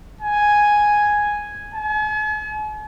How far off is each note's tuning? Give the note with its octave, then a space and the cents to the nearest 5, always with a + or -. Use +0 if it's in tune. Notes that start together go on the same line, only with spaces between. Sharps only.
G#5 +0
G#5 +45